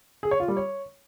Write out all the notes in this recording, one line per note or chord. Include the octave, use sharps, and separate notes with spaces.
G#4
C#5
F4
G3
C#5